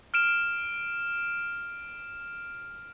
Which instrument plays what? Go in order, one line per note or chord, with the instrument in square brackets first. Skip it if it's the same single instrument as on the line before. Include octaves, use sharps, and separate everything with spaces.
[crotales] F6 D7 E7